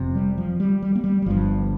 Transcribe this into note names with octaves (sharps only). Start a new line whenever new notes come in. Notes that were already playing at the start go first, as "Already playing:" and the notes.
Already playing: F1 F2 C3
G3
F3
G3
G3
A#3
G3
G3
G1 G2 F3